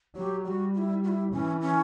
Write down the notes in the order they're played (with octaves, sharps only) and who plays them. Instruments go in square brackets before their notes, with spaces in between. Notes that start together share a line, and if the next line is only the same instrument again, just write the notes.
[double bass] F#3 [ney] G4
[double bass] G3 [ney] F#4 G4
[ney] F#4
E4
F#4
E4
[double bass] E3 [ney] C#4
[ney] C#4